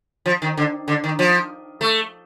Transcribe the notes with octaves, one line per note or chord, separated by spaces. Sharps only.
F3
D#3
D3
D3
D#3
F3
A3